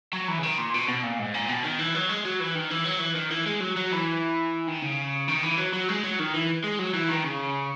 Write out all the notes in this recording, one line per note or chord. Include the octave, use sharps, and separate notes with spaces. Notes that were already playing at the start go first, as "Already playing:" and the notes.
F#3
E3
C#3
D#3
A#2
B2
B2
A#2
G#2
A#2
B2
D#3
E3
F#3
G#3
F#3
E3
D#3
E3
F#3
E3
D#3
E3
G#3
F#3
F#3
E3
D#3
C#3
D#3
E3
F#3
F#3
G#3
F#3
D#3
E3
G#3
F#3
E3
D#3
C#3